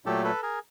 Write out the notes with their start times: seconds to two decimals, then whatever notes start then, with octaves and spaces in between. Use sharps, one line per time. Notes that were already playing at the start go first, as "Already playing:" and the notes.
0.06 A#2 F#3 A3 G4 A4
0.24 A4 B4
0.42 G#4 A#4